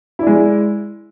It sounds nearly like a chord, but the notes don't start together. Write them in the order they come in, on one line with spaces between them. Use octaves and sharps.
E4 D5 G#3